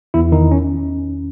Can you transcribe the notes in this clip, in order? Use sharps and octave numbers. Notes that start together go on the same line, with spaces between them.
E2 E4
D#3 D#4
C#4